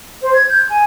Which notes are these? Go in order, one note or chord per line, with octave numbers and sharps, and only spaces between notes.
C5
G#6
G6
G#5